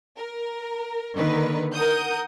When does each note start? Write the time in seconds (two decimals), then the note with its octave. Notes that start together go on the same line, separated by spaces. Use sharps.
0.17 A#4
1.17 D3 D#3 A#3 A#4 B4
1.73 A#4 F#5 D#6 G6